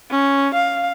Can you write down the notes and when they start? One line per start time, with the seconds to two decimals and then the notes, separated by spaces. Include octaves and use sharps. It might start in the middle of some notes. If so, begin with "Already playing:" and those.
0.11 C#4
0.54 F5